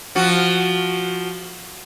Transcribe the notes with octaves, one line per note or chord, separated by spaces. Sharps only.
F3 F#4